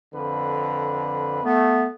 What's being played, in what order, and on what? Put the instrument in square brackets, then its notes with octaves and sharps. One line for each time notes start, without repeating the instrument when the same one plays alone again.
[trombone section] F2 D3 B4
[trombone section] A3 [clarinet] B3